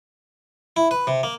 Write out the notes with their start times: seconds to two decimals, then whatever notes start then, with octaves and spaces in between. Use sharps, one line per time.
0.76 E4
0.91 B4
1.07 C3
1.23 A#3